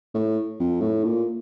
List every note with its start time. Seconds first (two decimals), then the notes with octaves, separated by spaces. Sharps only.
0.14 A2
0.59 F2
0.82 A2
1.04 A#2